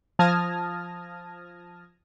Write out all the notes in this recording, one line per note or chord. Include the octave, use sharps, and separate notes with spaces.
F3 A5 D#6 F6 G#6 A#6